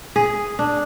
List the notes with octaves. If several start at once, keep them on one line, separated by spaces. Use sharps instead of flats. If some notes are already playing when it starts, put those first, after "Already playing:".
G#4
D4